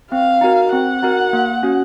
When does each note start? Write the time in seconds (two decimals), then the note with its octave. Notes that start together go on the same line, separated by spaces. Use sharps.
0.12 C4 F5
0.41 D#4 F#4 A#4
0.72 C4 F#5
1.03 D#4 F#4 A#4
1.33 A#3
1.63 C#4 F#4